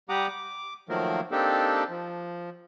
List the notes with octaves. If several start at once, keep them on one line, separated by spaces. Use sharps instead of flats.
G3 G4 F#5 A#5 D6 D#6
D6
D#3 F3 F#3 A3 A#3 A#4
A#3 C4 D4 D#4 G4 A4
F3